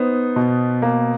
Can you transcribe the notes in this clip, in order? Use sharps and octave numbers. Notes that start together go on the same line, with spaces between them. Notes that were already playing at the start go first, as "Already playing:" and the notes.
Already playing: B3 D#4 C5
B2
A#3